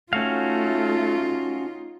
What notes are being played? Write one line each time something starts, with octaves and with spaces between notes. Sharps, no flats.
A3 C#4 D#4 F4 F#4 F5